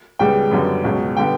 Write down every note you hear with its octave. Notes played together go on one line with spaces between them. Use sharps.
C#2 C#3 G3 B3 G5
F#2 D3 G3 B3
C#2 B2 F#3
D3 G3 B3 G5